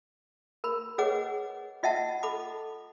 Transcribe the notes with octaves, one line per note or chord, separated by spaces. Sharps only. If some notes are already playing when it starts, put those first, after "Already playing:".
A#4 B5
G#4 B4 C#5 D#5 F#5 D6
F4 D#5 E5 F#5 A5
A4 B5 D6